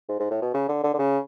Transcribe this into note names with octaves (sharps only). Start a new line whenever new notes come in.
G#2
G#2
A2
B2
C#3
D3
D3
D3
C#3